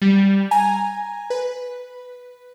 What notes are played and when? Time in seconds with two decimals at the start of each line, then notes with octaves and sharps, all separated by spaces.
0.02 G3
0.51 G#5 A#5
1.30 B4